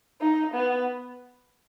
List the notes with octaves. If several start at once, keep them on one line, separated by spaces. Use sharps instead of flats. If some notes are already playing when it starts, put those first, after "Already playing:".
D#4
B3